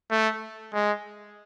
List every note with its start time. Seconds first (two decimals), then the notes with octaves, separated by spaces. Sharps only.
0.11 A3
0.73 G#3